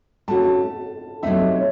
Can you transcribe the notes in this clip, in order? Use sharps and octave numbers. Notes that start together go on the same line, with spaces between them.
A3 C#4 F#4 A5
C3 F#3 A3 C4 D#4 E5
C#5